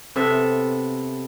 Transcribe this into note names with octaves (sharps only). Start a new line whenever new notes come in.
C3 B3 A4 E5